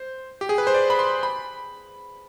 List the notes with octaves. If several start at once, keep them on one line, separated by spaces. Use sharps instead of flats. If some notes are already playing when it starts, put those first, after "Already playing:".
Already playing: C5
G4
G#4
B4
C5
D5
B5
C6
B5